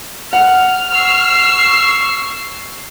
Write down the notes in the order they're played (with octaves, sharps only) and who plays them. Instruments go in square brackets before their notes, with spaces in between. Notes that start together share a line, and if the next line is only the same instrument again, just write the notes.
[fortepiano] F#5 [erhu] F6
[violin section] C#6 E6 C7